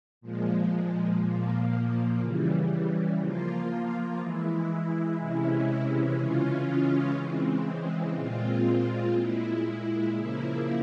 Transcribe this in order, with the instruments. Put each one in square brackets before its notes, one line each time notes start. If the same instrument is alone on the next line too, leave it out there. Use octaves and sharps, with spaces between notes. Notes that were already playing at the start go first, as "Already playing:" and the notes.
[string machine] A#2 F3 G#3
A#2 F3 A#3
C#3 E3 G3
F3 A#3 F4
E3 G#3 E4
C3 E3 G#3 C#4 E4
C#3 E3 G#3 C#4 F4
C#3 E3 G#3 C4
A#2 G#3 C4 F4
A#2 G#3 E4
C#3 F3 A#3 E4